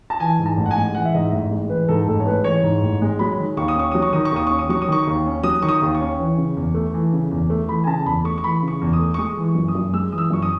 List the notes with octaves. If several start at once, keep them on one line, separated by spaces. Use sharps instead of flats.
A5
E3 G#5
G#2
A5
A1
F#5
G#5
G#3
E3 F#5
E5
G#2 D#5
E5
A1
G#3
E3 B4
G#2 A4
A1 A4
C#5
G#3 B4
E3 C#5
G#2
A1
G#3
F#3 B5
D#3
D#2 C#6
D#6
C#4 C#6
F#3 D#6
C#6
D#3 D#6
C#6
D#2 D#6
C#4 C#6
D#6
F#3 C#6
D#6
D#3 C#6
D#2
C#4
F#3 D#6
D#3 C#6
D#6
D#2
C#6
C#4
E3
C#3
E2
A3
E3
C#3
E2
A3
E3 B5
G#5
C#3 A5
E2 B5
A3 C#6
C#6
E3 B5
C#3
C#6
E2
D#6
A3
C#6
G#3 D#6
E3
C#6
F#2
D#6
F#2
G#3 E6
E3 D#6
E6
F#2 C#6
D#6